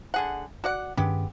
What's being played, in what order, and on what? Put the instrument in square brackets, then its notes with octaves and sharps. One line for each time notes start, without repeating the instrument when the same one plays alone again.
[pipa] D3 G#4 F#5
F#4 D5 F#5
[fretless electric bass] G2 D#3 C#4 [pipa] G#3 B3 G4